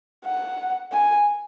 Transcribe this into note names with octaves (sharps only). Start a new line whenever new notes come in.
F#5
G#5